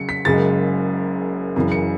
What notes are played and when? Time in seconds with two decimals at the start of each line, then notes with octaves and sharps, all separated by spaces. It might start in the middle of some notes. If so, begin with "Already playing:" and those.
Already playing: C#3 F#3 C#7
0.09 B6
0.25 F#1 F#2 C#3 G#3 A6
1.56 F#1 F#2 C#3 E3
1.72 C#7